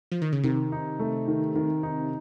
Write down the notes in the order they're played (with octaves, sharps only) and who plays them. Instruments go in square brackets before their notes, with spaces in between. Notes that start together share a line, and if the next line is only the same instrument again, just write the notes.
[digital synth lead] F3
D#3
C#3
[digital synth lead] C3 [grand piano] D#3
[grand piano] D#4
A3
D#3
D#3
D#4